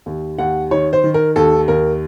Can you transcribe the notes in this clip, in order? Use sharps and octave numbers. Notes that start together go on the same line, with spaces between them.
D#2
D#2 F#5
D#3 C#5
C5
D#3
A#4
D#2 A4
D#2 A#4